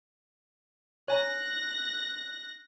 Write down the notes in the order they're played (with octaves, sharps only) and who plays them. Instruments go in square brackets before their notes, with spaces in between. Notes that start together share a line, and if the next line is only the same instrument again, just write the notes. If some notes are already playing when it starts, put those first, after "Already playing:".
[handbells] C#5 G#5 A#5 [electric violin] F#6 A#6